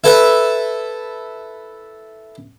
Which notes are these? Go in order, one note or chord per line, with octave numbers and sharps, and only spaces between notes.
E4 A4 B4 E5 A5